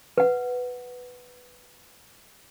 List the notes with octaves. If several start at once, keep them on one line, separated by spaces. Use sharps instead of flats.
B4 F#5